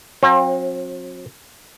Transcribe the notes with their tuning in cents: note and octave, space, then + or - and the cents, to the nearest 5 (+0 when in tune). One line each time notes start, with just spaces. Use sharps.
F#3 -40 C4 +40